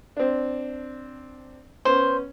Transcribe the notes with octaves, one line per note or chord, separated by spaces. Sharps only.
C4 D4
B3 C#4 C5